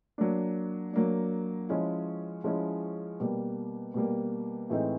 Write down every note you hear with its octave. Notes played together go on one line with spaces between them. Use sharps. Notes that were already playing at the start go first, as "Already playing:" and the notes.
F#3 A#3 D4
F#3 A#3 D4
F3 G#3 C#4 E4
F3 G#3 C#4 E4
B2 G3 A#3
B2 G3 A#3
A2 E3 G#3 C4 D#4